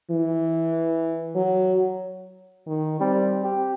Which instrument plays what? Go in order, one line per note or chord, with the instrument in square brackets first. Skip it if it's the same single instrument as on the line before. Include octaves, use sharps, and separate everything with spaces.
[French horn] E3
[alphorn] F#3
[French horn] D#3
[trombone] G3 [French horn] C4
[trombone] G4